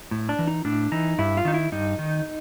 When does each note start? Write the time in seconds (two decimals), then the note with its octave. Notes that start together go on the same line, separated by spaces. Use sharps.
0.11 A2
0.29 D4
0.39 E3
0.47 D#4
0.65 A2 D4
0.92 E3 D#4
1.18 G2 E4
1.37 F4
1.45 D#3 D#4
1.54 E4
1.72 G2 D#4
1.99 D#3